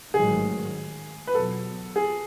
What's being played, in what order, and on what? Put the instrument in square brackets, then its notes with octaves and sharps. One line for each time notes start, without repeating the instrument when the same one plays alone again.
[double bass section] A1 G#2 D#3 F#3 [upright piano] G#4
[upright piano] B4
[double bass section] E2 B2 F#3 B3 [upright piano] A4
[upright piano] G#4